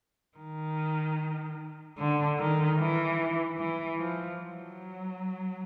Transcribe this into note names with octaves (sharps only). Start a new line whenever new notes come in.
D#3
D3
D#3
E3
E3
F3
F#3